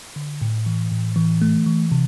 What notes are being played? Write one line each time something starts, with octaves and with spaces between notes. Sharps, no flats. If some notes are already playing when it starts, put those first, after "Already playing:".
D3
A2
E3
A2
E3
A3
E3
C3